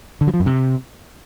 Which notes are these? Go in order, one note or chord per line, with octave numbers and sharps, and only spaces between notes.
D3
F#3
F3
F#2
C3